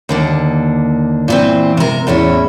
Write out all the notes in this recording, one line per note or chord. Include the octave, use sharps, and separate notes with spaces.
D#2 D3 A#3
A#2 E3 C4
C3 A#4
E2 A2 C#4 E4